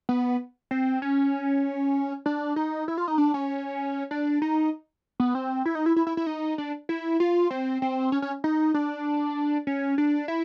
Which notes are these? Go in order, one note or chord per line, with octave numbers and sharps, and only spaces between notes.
B3
C4
C#4
D4
D#4
E4
F4
D#4
D4
C#4
D4
D#4
B3
C4
E4
D#4
E4
E4
E4
E4
D#4
D4
E4
F4
C4
C4
C#4
C#4
D#4
D4
C#4
D4
E4